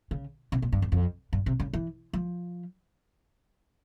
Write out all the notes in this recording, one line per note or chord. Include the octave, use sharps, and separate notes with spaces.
C#3
C3
A#2
G2
E2
F2
G2
C3
C#3
E3
F3